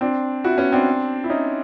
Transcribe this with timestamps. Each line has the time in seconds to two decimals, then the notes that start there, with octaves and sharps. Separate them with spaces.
0.01 C4 D4
0.44 E4 F#4
0.58 B3 C#4
0.72 C4 D4
1.24 E4
1.30 C#4 D#4